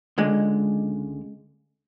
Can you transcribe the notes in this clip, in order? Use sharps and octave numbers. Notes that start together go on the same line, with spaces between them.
C#2 D3 G#3